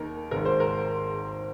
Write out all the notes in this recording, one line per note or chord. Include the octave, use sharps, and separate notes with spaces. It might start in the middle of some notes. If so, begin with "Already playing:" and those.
Already playing: D#2 D#3 A#3 D#4 A#4
G#1 G#2 D#3 A#3 A#4
C5
A#4